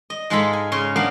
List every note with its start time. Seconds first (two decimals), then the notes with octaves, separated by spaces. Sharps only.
0.10 D#5
0.30 G#2 G#3 F4 G#4 A4 B5
0.53 G#5
0.72 G#2 C#3 C#5 C6
0.96 F#3 A#3 B3 D4 F5